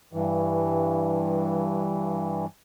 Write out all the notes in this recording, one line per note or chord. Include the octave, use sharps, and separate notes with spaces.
G2 E3